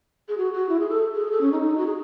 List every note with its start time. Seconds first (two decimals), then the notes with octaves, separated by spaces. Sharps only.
0.29 G#4
0.38 F#4
0.53 F#4
0.69 E4
0.80 G#4
0.90 A4
1.15 G#4
1.32 A4
1.41 C#4
1.52 D#4
1.62 D#4
1.78 F#4
1.87 G#4